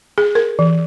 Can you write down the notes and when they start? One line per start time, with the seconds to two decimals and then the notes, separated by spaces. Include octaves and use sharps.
0.18 G#4
0.35 A#4
0.59 E3